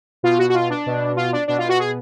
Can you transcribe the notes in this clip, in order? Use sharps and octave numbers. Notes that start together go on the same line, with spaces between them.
B2 F4
F#4
F#4
F4
D4
B2
F4
D4
B2 D4
F4
F#4
G#4